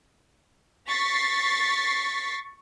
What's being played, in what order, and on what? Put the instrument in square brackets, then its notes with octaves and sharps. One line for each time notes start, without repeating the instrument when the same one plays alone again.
[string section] C#6 A6 B6 C7